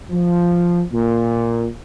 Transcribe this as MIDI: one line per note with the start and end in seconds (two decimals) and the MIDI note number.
0.12 0.81 53
0.92 1.65 46